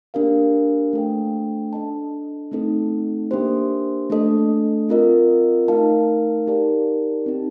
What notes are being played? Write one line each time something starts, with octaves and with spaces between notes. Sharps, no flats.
A#3 D4 G4 A#4 F5
A3 D4 A4 C5 G5
D4 A4 D#5 A5
A3 C4 D#4 A4
A#3 D4 G4 C5
A3 D4 A4 D#5
C4 F4 A#4 D#5
A3 D#4 A#4 F5 A5
D#4 G4 A#4 D5 A5
C4 D#4 G4